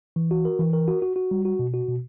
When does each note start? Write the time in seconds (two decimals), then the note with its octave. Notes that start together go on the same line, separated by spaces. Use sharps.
0.16 E3
0.31 F#4
0.45 A#4
0.59 E3
0.73 A#4
0.88 F#4
1.02 F#4
1.16 F#4
1.31 G3
1.45 F#4
1.59 B2
1.74 F#4
1.88 B2